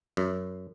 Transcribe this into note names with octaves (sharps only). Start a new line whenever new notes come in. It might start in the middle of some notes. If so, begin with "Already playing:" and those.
F#2